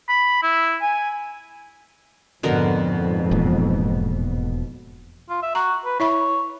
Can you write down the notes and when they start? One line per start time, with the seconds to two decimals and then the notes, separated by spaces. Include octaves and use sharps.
0.09 B5
0.43 E4
0.82 G#5
2.43 F2 G#2 B2 D3 A#4
3.31 E1 E2 A#2
5.29 F4
5.42 E5
5.55 F#4 A#5
5.85 B4
6.00 E4 C#5 E5 B5